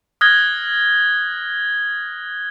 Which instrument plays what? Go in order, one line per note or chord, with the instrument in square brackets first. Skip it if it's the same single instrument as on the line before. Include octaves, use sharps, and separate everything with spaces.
[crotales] D#6 F6 F#6 G#6 A#6 G7